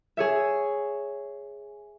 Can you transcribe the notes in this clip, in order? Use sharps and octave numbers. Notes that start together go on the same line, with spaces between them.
G#4 C#5 E5